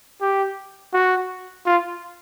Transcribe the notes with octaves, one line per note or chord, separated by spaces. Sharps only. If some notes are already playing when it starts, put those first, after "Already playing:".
G4
F#4
F4